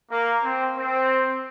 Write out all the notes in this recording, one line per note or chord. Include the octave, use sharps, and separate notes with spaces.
A#3
C4
C4